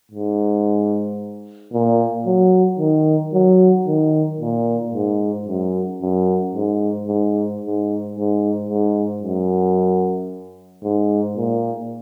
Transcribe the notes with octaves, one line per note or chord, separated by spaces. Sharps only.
G#2
A#2
F#3
D#3
F#3
D#3
A#2
G#2
F#2
F#2
G#2
G#2
G#2
G#2
G#2
F#2
G#2
A#2